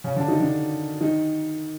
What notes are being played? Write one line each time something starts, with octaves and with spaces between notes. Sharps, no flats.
C#3 C#4
D3 D4
D#3 D#4
D3 D4
D#3 D#4